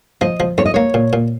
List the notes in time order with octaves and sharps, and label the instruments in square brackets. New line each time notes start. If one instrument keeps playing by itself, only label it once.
[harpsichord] F3 [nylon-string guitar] D#5
[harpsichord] F3
[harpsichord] F2 [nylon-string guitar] C#5
[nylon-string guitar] D#5
[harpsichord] A#3 [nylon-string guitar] C#5
[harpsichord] A#2
A#2